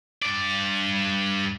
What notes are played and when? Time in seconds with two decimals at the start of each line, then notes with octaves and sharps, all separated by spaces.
0.23 G2 D5